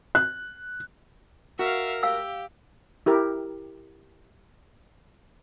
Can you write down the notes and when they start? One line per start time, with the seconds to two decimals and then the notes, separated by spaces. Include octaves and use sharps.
0.15 F#6
1.59 F#4 A#4 E5 F5
2.03 G4 F5 E6
3.06 E4 G4 A#4